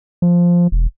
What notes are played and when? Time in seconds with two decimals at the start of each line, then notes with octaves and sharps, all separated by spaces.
0.22 F3
0.72 E1